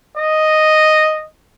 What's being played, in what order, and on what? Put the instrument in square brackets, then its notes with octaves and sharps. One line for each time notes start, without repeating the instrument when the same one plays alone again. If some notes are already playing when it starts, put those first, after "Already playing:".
[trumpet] D#5